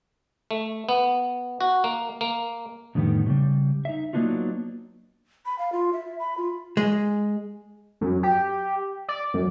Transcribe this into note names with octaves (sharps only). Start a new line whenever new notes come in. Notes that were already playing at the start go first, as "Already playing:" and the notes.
A3
B3
F#4
A#3
A#3
F2 A2 D3 D#3 G3 B3
A2 C#3 G3
D#4 E5
F#3 A#3 B3 D4 D#4 F4
B5
F5
F4
E5
B5
F4
G#3
F#2
G4
D5
F#2